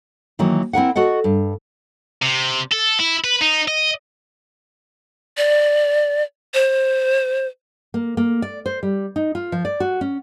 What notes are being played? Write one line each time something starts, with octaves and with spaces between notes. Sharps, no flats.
D#3 E3 F#3 A#3
C4 E4 A#4 F#5
F#4 A4 D#5 F#5
G2
C3
A4
E4
B4
D#4
D#5
D5
C5
A#3
A#3
D5
C5
G3
D#4
F4
F3
D5
F#4
C#4